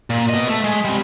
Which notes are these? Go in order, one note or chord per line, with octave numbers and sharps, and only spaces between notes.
A#2
B2 D#5
A3
G#3
G3 C4